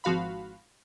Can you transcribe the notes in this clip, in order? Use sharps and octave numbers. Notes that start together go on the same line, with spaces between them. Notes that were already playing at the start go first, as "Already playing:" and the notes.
G#1 F3 F#4 F5 B5